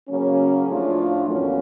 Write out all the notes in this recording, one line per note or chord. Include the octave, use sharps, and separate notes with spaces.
C#3 F#3 A#3 C#4
A2 F3 A3 D4 F4
E2 B2 F#3 A#3 C#4